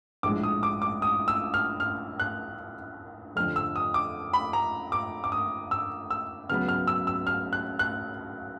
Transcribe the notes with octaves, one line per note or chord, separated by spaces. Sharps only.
A#1 A2 F3 G#3 D6
D#6
D6
D6
D#6
E6
F6
F6
F#6
F2 D3 F3 F6
E6
D#6
D6
B5
A#5
D6
D6
D#6
E6
E6
C#2 C#3 F#3 B3 F6
F6
E6
E6
F6
F#6
F#6